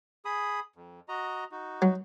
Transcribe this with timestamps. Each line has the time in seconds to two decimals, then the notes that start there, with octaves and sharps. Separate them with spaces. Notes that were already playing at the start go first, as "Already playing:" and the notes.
0.25 G#4 B5 D#6
0.76 F2
1.08 F#4 D#5 A#5
1.52 D#4 F#4
1.82 F#3